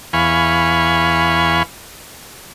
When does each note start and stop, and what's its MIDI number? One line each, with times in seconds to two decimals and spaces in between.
0.13 1.63 40
0.13 1.63 77
0.13 1.63 80
0.13 1.63 83
0.13 1.63 85